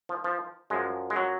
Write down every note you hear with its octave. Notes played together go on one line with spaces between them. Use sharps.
F3
F3
F#2 F3 G#3
G#3
F#3